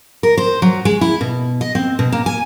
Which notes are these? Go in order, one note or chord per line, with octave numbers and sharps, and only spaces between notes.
A#4
C5
F#3
G#3
E4
B2
D#5
C4
B2
A#3
G#5